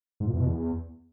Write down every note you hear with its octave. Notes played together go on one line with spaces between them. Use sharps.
G#2
A#2
E2
B2
E2